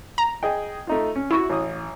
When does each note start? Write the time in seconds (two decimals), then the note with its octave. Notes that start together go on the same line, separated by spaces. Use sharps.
0.18 A#5
0.43 G#4 D#5 G5
0.87 A3 D#4 F4
1.16 C#4
1.31 E4 F#4 C#6 E6
1.49 A1 D#6